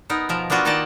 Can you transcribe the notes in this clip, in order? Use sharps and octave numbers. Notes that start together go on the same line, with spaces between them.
B3 D#4 A#4
B2 F3 A#4
A#3 B3 D4 F4 F#4
D#3 A#3 D#4 D5 D#5 A5